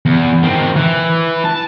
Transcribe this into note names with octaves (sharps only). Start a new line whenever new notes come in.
E2
D#3 C4
E3
A5